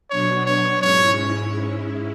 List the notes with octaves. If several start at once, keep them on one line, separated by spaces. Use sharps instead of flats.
B2 F#3 B3 D4 C#5
C#5
G#2 G#3 C#4 E4 C#5